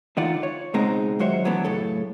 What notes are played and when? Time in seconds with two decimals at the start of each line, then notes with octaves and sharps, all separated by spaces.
0.17 D3 E3 D#4 F4 D5 F#5
0.43 C#5
0.74 C#2 B2 G#3 C4 D#4 A#5
1.19 D#2 F#3 F#4 C5 C#5 E5
1.45 E3 F#3 A3 B3 D4
1.64 F#2 A2 C#3 A3 A4 C#5